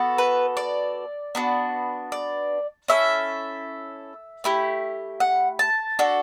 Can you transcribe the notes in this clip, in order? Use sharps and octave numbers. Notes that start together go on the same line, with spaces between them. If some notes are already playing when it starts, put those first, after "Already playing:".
Already playing: B3 F#4 A4
B4
D5
B3 D4 F#4
D5
C#4 E4 A4 E5
A3 E4 G4
F#5
A5
D4 F#4 A4